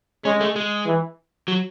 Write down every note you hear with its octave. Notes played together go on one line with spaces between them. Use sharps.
G#3 C#4
A3
G#3
E3
F#3